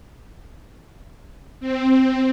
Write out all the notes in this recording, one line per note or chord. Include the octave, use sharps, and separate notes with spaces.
C4